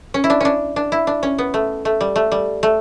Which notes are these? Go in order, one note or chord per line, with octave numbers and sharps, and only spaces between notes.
C#4
E4
D4
C#4 D4
D4
E4
D4
C#4
B3
A3
A3
G3
A3
G3
A3